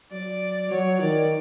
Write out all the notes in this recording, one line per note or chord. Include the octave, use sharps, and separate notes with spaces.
F#3 D5
F#3 C#5
D#3 D5